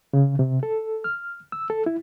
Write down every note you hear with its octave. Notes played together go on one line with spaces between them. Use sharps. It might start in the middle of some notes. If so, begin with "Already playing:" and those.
C#3
C3
A4
F6
E6
A4
E4